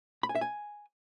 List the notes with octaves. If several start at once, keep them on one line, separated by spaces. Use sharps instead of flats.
B5
G#5
E5
G#5